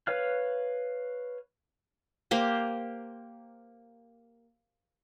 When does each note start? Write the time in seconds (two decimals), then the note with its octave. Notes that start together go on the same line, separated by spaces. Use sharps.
0.07 B4 C#5 F5 F6 F#6
2.31 A#3 G4 C5